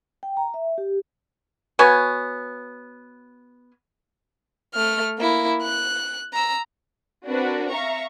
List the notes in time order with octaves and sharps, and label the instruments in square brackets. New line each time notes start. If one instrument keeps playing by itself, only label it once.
[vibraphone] G5
A#5
E5
G4
[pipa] B3 F#4 C#5 G#5
[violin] A3 F6
A#3 E4
F#6
A#5 E6
[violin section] C4 D4 F#4 A#4 B4
E5 F5 A#5 C#6